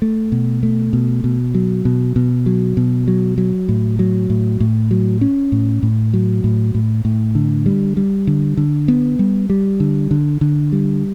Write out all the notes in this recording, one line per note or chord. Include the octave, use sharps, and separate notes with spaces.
A3
B2
A3
B2
B2
F#3
B2
B2
F#3
B2
F#3
F#3
A2
F#3
A2
A2
F#3
C#4
A2
A2
F#3
A2
A2
A2
D3
G3
G3
D3
D3
B3
G3
G3
D3
D3
D3
G3